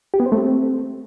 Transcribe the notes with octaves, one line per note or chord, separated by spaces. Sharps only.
G4
B3
C5
A3
C4